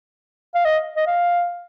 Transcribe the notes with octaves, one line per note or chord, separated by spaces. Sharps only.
F5
D#5
D#5
F5